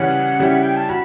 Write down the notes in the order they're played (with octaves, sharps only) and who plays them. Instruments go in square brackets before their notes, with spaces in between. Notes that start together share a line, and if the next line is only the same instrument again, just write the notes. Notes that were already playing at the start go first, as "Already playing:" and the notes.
Already playing: [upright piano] C#3 E3 G3 C#4 [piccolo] F#5
[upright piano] C#3 G3 C#4 E4 G4
[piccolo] G5
A5
[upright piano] F#4 [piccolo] B5